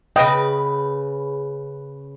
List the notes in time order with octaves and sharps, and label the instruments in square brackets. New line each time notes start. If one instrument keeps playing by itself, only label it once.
[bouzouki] C#3 B4 [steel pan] D#5 G5